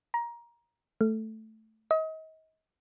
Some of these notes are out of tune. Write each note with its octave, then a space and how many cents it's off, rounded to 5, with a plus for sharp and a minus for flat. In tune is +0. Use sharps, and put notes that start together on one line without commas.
A#5 +20
A3 +0
D#5 +35